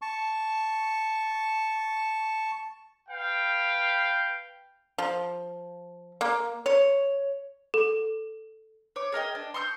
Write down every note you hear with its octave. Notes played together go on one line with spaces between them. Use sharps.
A5 C#6
B4 F5 G5
F3
A#3
C#5
A4
C#5 D6
G#4 A#4 D#5 G5
D4
C6 C#6 D#6 G6